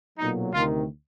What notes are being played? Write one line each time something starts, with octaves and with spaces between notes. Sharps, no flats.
B1 A#2 F#3 D#4
D2 C3 D#3 F4